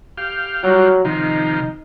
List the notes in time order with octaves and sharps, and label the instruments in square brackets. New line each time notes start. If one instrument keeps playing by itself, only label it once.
[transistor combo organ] G4 F5
[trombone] F#3 [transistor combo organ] G3 F4 F#4
[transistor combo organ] C3 D#3 F3 [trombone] D#4